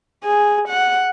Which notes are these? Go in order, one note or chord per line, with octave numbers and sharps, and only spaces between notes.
G#4
F#5